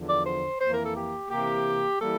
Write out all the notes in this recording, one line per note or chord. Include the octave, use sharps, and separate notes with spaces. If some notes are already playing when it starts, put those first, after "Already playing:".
Already playing: E2 D3 F3
D5
C5
F2 E3 A#3 C5
A#4
A4
G4
C3 E3 A#3 G4
E3 G3 A#3 A4